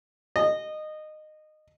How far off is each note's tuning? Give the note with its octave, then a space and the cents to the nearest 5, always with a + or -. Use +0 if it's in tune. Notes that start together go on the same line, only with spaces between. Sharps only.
D#5 -15